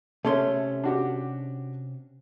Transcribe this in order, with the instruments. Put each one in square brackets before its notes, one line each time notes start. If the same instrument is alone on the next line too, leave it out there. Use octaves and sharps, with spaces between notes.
[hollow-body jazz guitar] C3 C#4 C6 [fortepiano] A3
[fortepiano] D4 F#4 G4